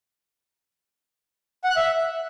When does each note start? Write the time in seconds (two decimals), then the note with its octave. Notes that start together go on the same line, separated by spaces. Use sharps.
1.64 F#5
1.70 F#6
1.76 E5